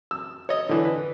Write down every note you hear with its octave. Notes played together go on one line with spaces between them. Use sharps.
E6
C#5 D#5
D3 E3
B4